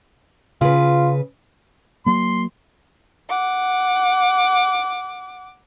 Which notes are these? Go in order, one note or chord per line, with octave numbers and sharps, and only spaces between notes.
C#3 F4 B4
F#3 A#3 C6
F#5 D6